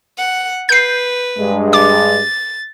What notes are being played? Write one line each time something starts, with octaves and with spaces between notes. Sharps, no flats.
F#5
B4 G6 C7
G2 G#3
D6 A6